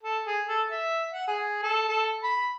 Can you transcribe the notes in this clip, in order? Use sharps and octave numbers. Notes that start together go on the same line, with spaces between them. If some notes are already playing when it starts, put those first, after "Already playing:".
A4
G#4
A4
E5
F#5
G#4
A4
A4
B5